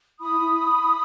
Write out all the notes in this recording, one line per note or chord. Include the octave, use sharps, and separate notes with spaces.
E4 B5 D#6
E4